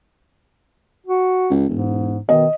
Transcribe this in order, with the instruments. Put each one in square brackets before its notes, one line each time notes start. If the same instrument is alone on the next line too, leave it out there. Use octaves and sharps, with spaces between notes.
[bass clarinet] F#4
[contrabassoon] C#2
[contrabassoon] E1 [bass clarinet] G#2
[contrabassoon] B2 [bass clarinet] D#3 [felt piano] D#5